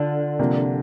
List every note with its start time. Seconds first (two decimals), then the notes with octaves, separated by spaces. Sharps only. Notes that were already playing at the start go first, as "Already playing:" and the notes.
Already playing: D3 F4
0.39 C3 F3 A#3 D4